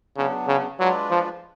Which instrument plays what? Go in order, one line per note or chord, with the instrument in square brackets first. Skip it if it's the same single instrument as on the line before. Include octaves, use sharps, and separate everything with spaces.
[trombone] C#3 [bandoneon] F#3 B3 D4
[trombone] C#3
[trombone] F#3 [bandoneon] G#3 D4 F4 B4 D5
[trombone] F3